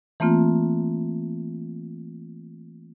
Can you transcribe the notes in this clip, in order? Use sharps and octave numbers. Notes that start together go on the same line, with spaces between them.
E3 A3 A#3 C4 F4